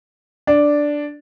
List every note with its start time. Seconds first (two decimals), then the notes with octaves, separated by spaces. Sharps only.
0.47 D4